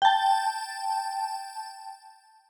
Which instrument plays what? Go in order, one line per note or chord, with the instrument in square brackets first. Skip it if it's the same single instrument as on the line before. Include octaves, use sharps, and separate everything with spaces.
[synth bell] G5 A5